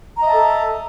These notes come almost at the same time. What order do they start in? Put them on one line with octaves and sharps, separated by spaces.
A#5 D#5 E5 A5 A4